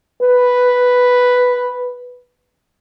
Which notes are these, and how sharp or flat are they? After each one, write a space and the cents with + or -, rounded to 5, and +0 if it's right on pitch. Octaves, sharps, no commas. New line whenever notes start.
B4 +0